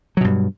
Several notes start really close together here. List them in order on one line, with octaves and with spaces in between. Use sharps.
F#3 B2 G2